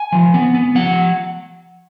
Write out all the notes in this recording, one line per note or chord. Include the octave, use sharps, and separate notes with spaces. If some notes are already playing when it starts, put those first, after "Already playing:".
Already playing: G#5
F3
B3
B3
F3 F#5